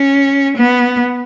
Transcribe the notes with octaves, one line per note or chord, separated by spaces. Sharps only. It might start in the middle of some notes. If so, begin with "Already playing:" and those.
Already playing: C#4
B3